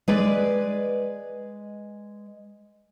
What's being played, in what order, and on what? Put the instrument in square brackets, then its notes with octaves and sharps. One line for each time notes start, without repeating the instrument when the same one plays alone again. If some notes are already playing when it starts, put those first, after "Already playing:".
[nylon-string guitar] G#3 B4 D5